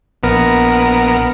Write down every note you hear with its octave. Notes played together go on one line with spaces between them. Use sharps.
A#1 B3 A#4